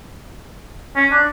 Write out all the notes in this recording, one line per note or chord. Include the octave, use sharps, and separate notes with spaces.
C#4
D4